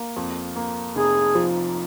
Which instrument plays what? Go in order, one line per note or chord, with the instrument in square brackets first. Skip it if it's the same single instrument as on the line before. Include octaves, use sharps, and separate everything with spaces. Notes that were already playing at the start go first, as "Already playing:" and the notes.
Already playing: [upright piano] A#3
F2
A#3
[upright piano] F1 [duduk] G#4
[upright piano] F3